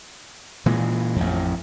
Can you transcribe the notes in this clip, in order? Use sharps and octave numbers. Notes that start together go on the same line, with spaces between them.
A#2 E3 G#3
A1 F2